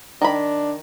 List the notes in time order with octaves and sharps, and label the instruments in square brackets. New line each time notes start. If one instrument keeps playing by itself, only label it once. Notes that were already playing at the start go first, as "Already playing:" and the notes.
[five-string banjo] D#3 B5 [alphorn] D4